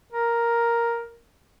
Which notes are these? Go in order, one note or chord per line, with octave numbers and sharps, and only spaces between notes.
A#4